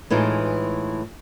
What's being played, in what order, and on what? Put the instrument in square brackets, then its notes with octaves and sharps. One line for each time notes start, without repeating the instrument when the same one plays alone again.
[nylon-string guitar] A2 E3 G#3 D#4 F4